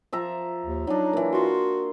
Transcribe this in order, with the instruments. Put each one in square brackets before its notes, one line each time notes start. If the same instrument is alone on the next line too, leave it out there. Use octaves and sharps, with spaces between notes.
[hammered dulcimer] F3 E5 A#5
[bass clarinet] D#2
[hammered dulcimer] F#3 D4 [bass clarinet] D#4
[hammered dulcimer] E3 A#3
[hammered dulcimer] F4 C6 [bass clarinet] F#4